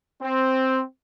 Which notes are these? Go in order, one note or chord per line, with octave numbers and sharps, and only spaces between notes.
C4